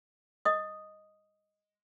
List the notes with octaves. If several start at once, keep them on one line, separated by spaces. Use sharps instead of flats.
D#5 D#6